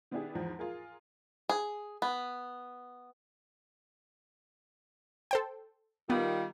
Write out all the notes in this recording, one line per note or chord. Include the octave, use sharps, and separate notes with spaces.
D#3 B3 D4 E4 G4 G#4
E2 G#2 F3
F4 G#4 A#4
G#4
B3
A4 C5 G5
D#3 G3 B3 F4